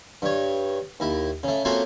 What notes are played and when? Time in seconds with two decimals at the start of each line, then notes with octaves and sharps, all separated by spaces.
0.22 G2 C#5
1.00 D#2 E4
1.43 C#3 A3
1.65 A3 A#3 C4 C#4 F4 F#4